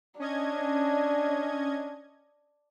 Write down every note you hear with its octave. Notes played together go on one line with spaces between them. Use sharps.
C#4 D4 D#5 G#6